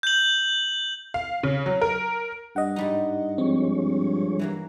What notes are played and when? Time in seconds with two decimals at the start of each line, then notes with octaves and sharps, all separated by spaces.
0.03 G6 F#7
1.14 F5
1.43 C#3
1.66 F#3
1.82 A#4
2.56 G2 D#5 F#5
2.76 G#2 G3 D#4
3.38 F3 G#3 C4 C#5
4.39 E3 F#3 A#3